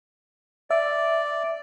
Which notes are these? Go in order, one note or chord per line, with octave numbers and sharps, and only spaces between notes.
D5 E5